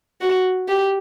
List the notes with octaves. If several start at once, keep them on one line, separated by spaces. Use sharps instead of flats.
F#4
G4